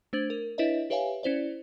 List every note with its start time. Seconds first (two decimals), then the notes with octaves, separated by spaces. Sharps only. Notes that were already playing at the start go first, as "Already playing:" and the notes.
0.13 A3 D4 C5 G#6 A6 F#7
0.30 A#4
0.58 D4 E4 B4 C#5 D#5 E5
0.90 G4 B4 C#5 E5 F5 G#5
1.23 C#4 E4 C5 D5